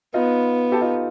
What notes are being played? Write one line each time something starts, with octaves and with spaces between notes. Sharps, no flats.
B3 D#4 F4
G4 A4
D#4 F4